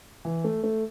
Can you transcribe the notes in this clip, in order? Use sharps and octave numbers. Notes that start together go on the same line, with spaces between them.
E3
A3
A3